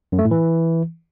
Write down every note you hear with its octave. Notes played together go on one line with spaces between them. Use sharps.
F#2
A3
A2
E3